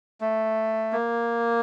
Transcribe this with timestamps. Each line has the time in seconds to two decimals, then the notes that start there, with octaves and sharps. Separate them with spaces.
0.21 A3
0.92 A#3